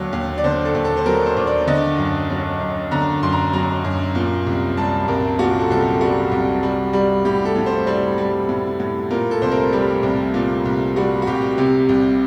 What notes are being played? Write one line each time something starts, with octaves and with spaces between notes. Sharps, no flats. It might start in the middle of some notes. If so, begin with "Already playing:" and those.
Already playing: D#2 D3 F#3
D#2
D5
D3 C5
A4
D#2
A4
C5
F#3 A#4
C5
D#2
D5
D3 D#5
F#2
F#3
F#2
D3 A#5
F#2 C6
A#5
F#3 A#5
F#2
A#2
C2
G3 A5
C2 A#4
A#2 F#4
A4
C2 A4
G4
G3 F#4
C2
G3
G3
A2 G4
A4
A2
C5
G3 C5
G3
A2
A2
A#2 A#4
A4
C2 C5
A#4
G3 G4
C2
A#2
C2
G3 F#4
F#4
C2 G4
C3
C2